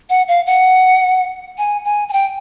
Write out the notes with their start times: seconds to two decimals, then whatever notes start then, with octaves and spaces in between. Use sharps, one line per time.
0.10 F#5
0.28 F5
0.46 F#5
1.58 G#5
1.85 G#5
2.09 G#5
2.13 G5